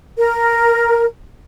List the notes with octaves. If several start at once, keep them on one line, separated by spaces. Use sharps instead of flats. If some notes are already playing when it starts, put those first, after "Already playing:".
A#4